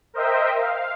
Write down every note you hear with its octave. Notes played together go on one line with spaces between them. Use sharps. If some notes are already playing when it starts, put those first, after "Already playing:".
A#4 C5 D#5 E5 G5
F5